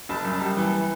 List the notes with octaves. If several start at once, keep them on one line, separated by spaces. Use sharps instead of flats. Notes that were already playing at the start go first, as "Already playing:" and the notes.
F#1 A5
F#2
A5
G3
E3